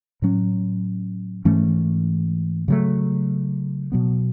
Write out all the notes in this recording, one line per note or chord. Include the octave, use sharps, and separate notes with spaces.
A2 F#3 C#4
G#2 E3 A3 C#4
C#3 F#3 A3
B2 F#3 B3